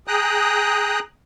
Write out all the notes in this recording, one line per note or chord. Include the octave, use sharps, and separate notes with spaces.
G#4 G5 A#5 D#6 F#6